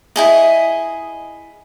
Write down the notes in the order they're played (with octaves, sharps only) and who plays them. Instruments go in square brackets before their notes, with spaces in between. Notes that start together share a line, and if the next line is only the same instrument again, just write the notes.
[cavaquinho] E4 G#4 D#5